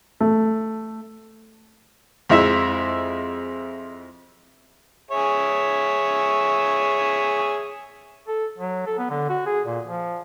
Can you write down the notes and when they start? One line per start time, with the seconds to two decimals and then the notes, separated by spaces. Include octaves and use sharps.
0.20 A3
2.30 F2 G#3 E4 E5
5.11 G#4 C#5 E5
8.28 A4
8.58 F#3
8.86 A4
8.98 B3
9.10 D3
9.29 F#4
9.46 G#4
9.66 A#2
9.85 F3